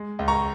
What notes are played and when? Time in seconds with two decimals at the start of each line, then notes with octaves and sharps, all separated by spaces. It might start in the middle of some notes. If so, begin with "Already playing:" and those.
Already playing: G#3
0.19 C#2
0.28 A#5 C#6